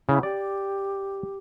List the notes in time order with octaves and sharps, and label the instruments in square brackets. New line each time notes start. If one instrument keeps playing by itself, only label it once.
[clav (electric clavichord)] C#3 [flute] E4
[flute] G4 [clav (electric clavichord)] D5